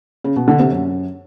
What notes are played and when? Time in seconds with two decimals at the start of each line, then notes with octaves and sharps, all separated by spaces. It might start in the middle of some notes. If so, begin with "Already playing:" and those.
0.24 C#3
0.36 B2
0.48 D3
0.59 C3
0.71 F#2